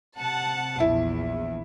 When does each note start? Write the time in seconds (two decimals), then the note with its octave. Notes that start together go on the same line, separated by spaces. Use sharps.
0.18 C3 F#5 A5
0.80 A#1 E2 E4